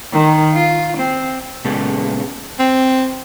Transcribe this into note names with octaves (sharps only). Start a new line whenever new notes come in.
D#3
F4
C4
A#2 C#3 G#3 B3 A4
C4